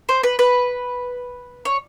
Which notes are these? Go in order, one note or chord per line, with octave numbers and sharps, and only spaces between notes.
C5
B4
B4
C#5